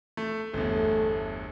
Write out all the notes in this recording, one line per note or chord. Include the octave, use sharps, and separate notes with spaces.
A3
G1 E2 A3